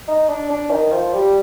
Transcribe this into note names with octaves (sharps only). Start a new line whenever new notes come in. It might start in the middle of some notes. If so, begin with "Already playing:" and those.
D#4
D4
D4
D#3
F3
G3